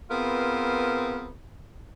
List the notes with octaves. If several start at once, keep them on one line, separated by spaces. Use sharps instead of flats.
B3 C4 F4 G#4 A#4 B4